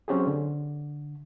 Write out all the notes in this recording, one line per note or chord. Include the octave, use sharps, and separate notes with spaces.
F#3 C4 C#4 G4 G#4
D3